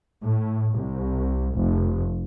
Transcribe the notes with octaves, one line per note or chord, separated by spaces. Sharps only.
A2
C2
F1